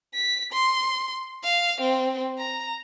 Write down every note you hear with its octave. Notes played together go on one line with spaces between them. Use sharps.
B6
C6
F5
C4
A#5